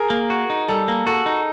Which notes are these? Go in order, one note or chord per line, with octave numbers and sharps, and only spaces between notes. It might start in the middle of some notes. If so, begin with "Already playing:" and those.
Already playing: G#4 A#4
A#3
F#4
D#4
G3 A4
A#3
F#4 A4
D#4